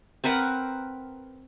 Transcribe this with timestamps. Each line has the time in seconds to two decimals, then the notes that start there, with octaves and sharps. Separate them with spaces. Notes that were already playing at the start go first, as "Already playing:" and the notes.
0.24 C4 A#4 B4 F#5